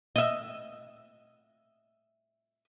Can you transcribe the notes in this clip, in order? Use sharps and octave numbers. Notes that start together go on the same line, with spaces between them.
D#5 E5